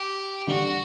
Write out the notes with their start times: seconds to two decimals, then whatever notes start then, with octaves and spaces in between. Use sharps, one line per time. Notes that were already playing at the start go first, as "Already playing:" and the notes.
Already playing: G4
0.47 D3 G3 D4 F#4